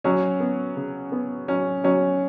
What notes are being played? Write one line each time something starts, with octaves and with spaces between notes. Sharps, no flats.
F#3 C#4
B3
C#3
B3
F#3 C#4
F#3 C#4